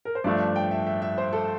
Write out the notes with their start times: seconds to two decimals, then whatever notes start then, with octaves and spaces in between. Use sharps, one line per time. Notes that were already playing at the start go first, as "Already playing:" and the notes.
0.05 A#4
0.15 C5
0.24 G2 F3 A3 D4 D5
0.41 E5
0.56 G5
0.71 E5
0.87 E5
1.02 E5
1.18 C5
1.33 A4